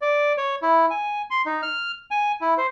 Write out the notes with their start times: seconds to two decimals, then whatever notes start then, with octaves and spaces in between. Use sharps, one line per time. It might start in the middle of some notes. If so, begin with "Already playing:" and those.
0.02 D5
0.38 C#5
0.62 E4
0.90 G#5
1.30 C6
1.46 D#4
1.63 F6
2.11 G#5
2.41 E4
2.57 C5